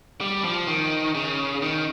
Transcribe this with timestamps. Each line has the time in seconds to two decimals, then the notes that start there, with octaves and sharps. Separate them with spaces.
0.21 G3
0.44 F3
0.67 D#3
1.15 C#3
1.62 D#3